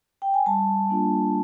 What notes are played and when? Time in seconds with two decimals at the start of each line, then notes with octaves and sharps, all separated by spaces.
0.22 G5
0.34 G#5
0.46 G3 A5
0.90 A#3 D4 F4